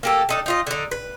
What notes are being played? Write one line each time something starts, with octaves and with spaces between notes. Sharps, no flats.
A#3 G4 A4
D4 D#4 A4
D#4 F4 D#5
D3 D#4
B4